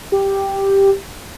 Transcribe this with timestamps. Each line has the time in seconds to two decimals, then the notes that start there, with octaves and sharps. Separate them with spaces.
0.12 G4